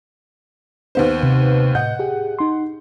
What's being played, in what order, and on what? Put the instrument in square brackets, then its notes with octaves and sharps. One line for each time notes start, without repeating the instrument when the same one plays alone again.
[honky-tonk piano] D#2 B3 C5
[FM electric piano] C3
[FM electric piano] A2 D#5 G6 [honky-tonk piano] F#5
[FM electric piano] G4 G#4
D#4 C6